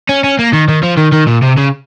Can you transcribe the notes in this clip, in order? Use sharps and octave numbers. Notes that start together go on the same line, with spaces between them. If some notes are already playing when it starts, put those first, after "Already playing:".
C#4
C#4
A#3
D#3
D#3
F3
D#3
D#3
A#2
C3
C#3